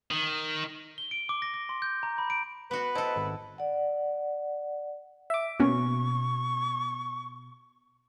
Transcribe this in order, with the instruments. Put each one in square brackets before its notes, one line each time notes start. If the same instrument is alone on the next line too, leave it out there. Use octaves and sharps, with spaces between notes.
[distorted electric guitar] D#3
[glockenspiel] G7
D7
D6
A#6
A#6
C6
G6
A#5
B5
D7
[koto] B3 F#4 [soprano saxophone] B4
[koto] E4 A4 [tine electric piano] C5 D#5 A5
[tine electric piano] G#1
[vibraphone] D5 F#5
[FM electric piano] E5 D6
[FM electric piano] B2 [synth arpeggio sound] A#3 C#4 F#4 [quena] C#6